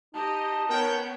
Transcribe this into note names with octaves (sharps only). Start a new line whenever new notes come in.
D#4 G4 D#5 A5
B3 C#4 A#4 C#5 G5